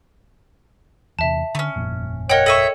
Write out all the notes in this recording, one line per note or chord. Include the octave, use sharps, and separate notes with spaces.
E2 C3 E5 A5
D3 A3 C#4
G1 F2 A#2
A#4 C#5 D#5 F#5 G5 F#6
A4 D#5 E5 C#6 D#7 E7